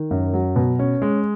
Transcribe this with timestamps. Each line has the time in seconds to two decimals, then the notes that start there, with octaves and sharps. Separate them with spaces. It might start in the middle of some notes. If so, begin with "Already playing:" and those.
Already playing: D#3
0.11 F#2
0.34 F#3
0.56 B2
0.79 C#4
1.02 G#3